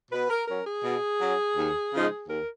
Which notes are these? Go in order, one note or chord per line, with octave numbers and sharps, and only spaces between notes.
B2 B4
A#4
F#3 C#4 A#4
G#4
B2
F#3 C#4
D#2
C#3 F3 G#3 D#4
D#2 A#4